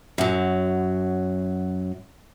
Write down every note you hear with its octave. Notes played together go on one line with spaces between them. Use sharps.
F#2 F#3